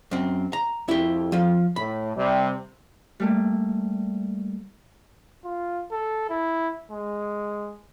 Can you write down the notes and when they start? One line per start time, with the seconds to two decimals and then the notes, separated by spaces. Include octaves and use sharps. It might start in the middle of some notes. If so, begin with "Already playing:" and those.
0.11 F#2 C4
0.53 A#5
0.88 F2 E4 G4
1.32 F3 F4
1.76 A2 B5
2.16 C3 G3
3.20 G3 A3 A#3
5.45 F4
5.92 A4
6.30 E4
6.91 G#3